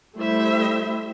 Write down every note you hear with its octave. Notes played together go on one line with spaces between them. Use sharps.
G3 A3 E4 C5 E5